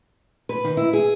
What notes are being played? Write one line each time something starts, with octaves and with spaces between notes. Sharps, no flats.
B4
D#3
E4
G#4